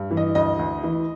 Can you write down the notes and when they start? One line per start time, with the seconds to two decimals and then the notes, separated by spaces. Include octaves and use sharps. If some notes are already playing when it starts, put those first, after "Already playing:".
Already playing: G2
0.11 E3
0.17 D#5
0.35 D2 D#5
0.59 D2
0.83 E3